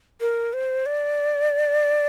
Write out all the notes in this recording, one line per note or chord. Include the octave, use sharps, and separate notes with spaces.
A#4
C5
D5